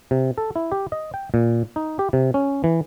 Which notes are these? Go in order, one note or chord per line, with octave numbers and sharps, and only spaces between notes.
C3
A4
E4
G4
D#5
G5
A#2
D#4
G4
C3
C#4
E3